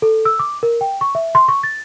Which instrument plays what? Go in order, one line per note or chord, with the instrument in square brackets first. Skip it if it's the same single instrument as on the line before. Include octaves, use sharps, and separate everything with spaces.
[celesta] A4
E6
D6
A#4
G5
C#6
E5
C6
C#6
A6